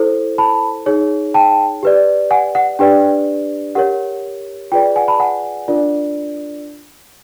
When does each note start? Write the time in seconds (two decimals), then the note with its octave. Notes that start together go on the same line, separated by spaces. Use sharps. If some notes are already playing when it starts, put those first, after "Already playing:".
Already playing: E4 A4 C5
0.38 A5 B5
0.86 D#4 G#4 C#5
1.34 G5 A5
1.83 G4 B4 D5
2.31 F#5 G#5
2.55 F#5
2.79 D4 G4 B4 D5 G5
3.75 G4 A#4 C#5 F#5
4.72 F4 G#4 B4 D5 G5
4.96 F#5 G#5
5.08 A5 B5
5.20 F#5 G#5
5.68 D4 F4 A#4 D5